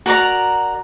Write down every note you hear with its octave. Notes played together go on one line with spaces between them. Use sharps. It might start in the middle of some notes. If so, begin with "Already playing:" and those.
F#4 A#4 D5 A#5